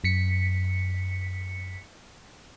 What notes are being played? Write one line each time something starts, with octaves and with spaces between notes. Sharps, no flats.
F#2 B6 C#7